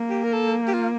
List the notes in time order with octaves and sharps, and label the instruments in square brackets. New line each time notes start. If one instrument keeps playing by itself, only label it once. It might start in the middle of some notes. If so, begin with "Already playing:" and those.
Already playing: [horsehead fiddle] A#3
[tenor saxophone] G4
A#4
A4
G4
F4